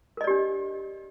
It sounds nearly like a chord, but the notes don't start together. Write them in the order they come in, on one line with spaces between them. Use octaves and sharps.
A#4 D#5 D5 G4 D4